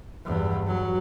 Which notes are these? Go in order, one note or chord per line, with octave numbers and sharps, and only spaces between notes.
E2 G2
F#3